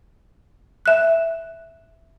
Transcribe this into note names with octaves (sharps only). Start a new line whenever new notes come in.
E5 F#6